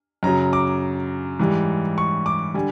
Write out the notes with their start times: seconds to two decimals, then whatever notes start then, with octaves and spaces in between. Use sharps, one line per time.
0.23 F#2 C#3 F#3 A#5
0.53 D6
1.39 G#2 E3 G3
1.98 C#6
2.26 D6
2.54 D3 G3 G#5